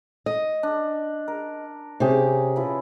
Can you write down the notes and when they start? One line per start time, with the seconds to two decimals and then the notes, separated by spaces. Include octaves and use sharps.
0.26 D#5
0.63 D4
1.28 A#4
2.00 C3 C#4 G4 G#4
2.56 F3 E4 B4